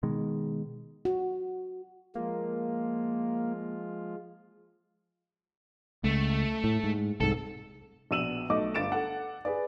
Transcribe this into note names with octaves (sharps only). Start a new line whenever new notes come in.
B2 D#3 G#3
F#4
F3 G#3 A#3 F4
C#2 A3
A2
G#2
C2 G#2 A4
A#1 B2 E6 D#7 E7 F#7
B1 A3 D#5 D6
G1 F4 A6 D7 E7
A4 F#5
G#4 B4 D5